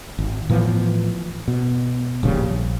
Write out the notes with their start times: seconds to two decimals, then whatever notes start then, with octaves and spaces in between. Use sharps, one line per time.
0.19 G#1
0.49 A2 E3 F3 B3
1.48 B2
2.23 D1 A#1 C#3 G3
2.49 A#1